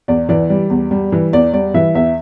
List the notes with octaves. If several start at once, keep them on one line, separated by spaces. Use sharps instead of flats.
E2 D5
E3 D5
G3
E2
G3
E3
E2 D5
G3 D5
E3 E5
E2 E5